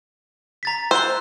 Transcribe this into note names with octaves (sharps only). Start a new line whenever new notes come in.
A#5 A6 B6
C5 E6 F#6 G7